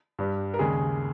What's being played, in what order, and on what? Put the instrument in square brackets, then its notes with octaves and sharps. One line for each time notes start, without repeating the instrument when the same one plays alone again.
[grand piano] G2 G3
A#4
D#2 C#3 G#3 G#4